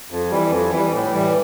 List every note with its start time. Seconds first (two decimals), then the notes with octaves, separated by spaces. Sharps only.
0.10 F2
0.30 E3 G3
0.51 F2
0.71 E3 G3
0.92 A2
1.12 E3 G3